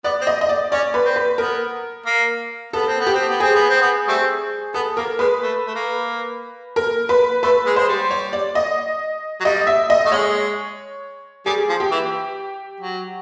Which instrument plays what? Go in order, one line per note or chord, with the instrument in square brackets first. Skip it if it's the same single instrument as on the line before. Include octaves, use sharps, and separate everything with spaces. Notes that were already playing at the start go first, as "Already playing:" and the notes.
[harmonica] B3 [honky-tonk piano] D5
[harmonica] C4
[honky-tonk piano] D#5
D#5
D5
[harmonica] C#4 [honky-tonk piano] D5
[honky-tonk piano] B4
[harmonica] C4
[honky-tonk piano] B4
[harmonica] B3 [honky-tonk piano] A#4
[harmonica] A#3
[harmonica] B3 [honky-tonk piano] A4
[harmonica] C4
B3
[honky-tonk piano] G4
[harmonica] C4
B3
[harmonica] C4 [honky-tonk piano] G#4
[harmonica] B3
C4
B3
G3 A3 C4
[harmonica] B3 [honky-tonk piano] A4
[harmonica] A#3 [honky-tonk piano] A#4
[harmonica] G#3 [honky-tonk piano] B4
[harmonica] A3
A3
A#3
[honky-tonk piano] A#4
B4
[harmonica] A3 [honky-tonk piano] B4
[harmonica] G#3
[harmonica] G#3 [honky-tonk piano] C5
[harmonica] G3
[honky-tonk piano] C#5
D5
D#5
[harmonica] F#3
[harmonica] G3 [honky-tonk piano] D#5
[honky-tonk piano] E5
D#5
[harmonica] A3
[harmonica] G#3 [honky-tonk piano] C#5
[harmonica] G3 [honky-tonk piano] G#4
[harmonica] F3
[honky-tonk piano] G4
[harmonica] E3
F#3